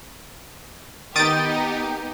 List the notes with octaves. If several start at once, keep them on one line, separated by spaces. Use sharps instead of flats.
D#3 B3 D#4 G4 D#6 G6 A6 D7